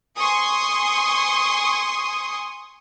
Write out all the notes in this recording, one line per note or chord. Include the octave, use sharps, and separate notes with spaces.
G#5 C6 C#6 D#6